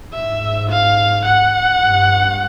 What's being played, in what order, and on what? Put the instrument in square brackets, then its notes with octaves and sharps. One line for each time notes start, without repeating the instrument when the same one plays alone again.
[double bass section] G#2 [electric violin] E5
[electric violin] F5
F#5
[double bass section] G2